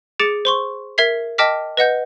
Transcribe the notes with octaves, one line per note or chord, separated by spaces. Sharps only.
G#4 D6 A6 C#7 D7 E7
C5 C6 C#6
A#4 E5 G#6 B6 C7
D#5 G5 A5 D6 F6 B6
B4 D#5 F#5 G6